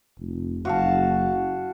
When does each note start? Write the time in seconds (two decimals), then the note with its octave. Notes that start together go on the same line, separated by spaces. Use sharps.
0.18 F1
0.65 F#1 F#4 F5 A5